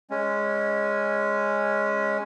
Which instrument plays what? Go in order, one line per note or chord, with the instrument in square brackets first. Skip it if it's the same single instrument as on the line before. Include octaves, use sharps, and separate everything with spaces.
[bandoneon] G#3 C#4